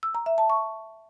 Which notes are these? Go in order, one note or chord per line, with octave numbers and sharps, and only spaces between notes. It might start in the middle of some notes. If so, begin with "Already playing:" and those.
E6
A#5
E5
A5
C#6